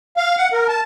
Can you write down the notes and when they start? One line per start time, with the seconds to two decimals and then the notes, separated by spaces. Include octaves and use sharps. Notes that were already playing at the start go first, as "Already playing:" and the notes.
0.17 F5
0.38 F#5
0.53 A#4
0.68 A5